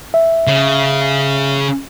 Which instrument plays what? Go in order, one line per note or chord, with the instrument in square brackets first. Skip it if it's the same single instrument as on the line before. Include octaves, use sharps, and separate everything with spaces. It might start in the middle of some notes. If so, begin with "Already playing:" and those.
[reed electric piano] E5
[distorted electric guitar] C#3